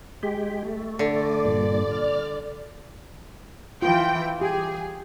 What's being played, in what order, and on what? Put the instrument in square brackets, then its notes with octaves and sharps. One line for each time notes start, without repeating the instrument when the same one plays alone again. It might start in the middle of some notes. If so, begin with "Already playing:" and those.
[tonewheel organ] G#3 G4
A3
[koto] D3 [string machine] D5
[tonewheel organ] G2 A#2
F6
[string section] E3 G5 [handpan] F4
[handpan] G4 [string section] G#4